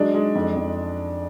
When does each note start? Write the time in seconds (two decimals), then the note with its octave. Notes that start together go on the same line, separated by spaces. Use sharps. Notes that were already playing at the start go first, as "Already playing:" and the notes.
Already playing: F#3 G#3 D4
0.14 G#3
0.35 F2
0.56 F2